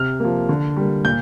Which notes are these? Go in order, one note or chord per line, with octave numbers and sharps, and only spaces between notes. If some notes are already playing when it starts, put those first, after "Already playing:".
Already playing: C3 F6
F3 A#3
D3
G3 A#3
A#2 G6